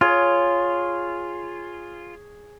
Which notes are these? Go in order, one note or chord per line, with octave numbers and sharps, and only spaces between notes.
F4 G#4 C#5